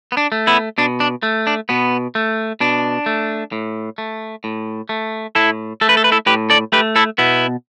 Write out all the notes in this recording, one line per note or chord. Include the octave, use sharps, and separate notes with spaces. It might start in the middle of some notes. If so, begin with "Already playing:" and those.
B3
D4
A3
B3 E4
B2 D4
D4
A3
D4
B2 B3
A3
B2 D4
A3
A2
A3
A2
A3
A2 E4 A4
A3 A4
B4
A4
B4
E4 A4
A2 G4 B4
A4 D5
A3 G4 B4
E4 A4
B2 B3 E4